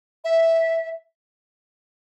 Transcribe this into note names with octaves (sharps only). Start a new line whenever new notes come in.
E5